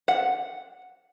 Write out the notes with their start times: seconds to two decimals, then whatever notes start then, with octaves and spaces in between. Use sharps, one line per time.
0.08 F#5